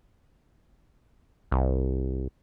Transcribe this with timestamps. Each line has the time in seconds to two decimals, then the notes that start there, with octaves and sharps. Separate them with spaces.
1.51 C2